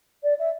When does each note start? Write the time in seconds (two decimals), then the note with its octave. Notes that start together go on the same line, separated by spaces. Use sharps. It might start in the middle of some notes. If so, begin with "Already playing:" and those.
0.23 D5
0.38 E5